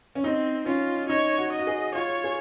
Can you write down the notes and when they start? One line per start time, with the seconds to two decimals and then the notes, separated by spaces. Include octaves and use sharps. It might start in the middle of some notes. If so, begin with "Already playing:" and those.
0.15 C#4
0.24 C4 D#4
0.66 C#4 F4
1.09 D#4 C#5
1.38 F#4
1.52 D#5
1.59 F#4
1.67 G#4
1.95 F4 C#5
2.24 G#4